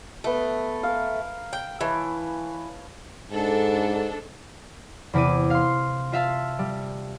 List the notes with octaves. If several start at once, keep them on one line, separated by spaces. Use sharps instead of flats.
A3 B3 A4
A#4 F5
G5
E3 B4 C#5 A5
G#2 D4 A4
E2 C3 E4 D6 D#7
F5 C6
F4 E5 F5 A5
G3